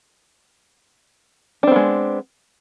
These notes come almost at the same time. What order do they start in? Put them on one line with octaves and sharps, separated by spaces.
D4 C4 B3 G#3